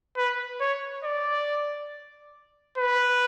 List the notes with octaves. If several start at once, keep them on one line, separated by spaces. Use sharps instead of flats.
B4
C#5
D5
B4